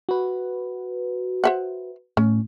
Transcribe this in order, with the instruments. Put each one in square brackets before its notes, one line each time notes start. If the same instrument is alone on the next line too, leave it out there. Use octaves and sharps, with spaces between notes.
[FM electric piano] F#4 B4
[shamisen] C5 E5 F#5
[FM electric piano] A2 [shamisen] C#4